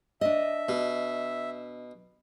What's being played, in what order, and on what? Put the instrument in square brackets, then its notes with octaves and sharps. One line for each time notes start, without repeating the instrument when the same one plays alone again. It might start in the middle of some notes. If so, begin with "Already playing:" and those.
[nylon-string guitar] D4 D#5 [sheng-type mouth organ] E5
[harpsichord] B2